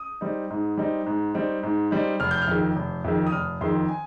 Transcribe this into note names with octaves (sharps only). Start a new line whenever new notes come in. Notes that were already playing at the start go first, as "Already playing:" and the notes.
Already playing: D#6
G3 C4 D#4
G#2
G3 C4 D#4
G#2
G3 C4 D#4
G#2
G3 C4 D#4
F1 F6
G6
F6
F2 D#3
F1
F2 D#3
D#6
F1 F6
F2 D#3 C6
G#5